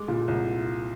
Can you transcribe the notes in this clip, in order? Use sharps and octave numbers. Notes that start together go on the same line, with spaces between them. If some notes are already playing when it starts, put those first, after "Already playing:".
Already playing: G#3 D6
A#2
C2